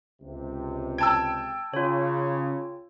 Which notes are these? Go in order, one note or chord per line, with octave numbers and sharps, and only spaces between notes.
C#2 C3
G5 A5 E6 G#6
C#3 F4 C#5